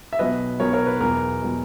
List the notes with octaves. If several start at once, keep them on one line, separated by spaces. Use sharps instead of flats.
E5
B1 B2 F#3 B4 D#5
B1 B2 F#3 A#4 C#5
A#4 C#5
B4
E2 B2 F#3 A#4
B2 F#3